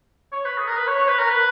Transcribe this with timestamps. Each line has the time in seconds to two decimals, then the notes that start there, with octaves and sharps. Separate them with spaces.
0.32 C#5
0.45 B4
0.58 G#4
0.68 A#4
0.77 B4
0.87 C#5
0.99 C#5
1.08 B4
1.19 A#4
1.31 B4